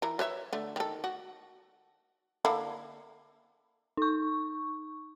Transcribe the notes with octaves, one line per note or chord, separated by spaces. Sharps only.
E3 A#4 A#5
B4 C#5 E5
D3 A3
D#3 A4
F#4
D3 A#3 E4
D#4 C#6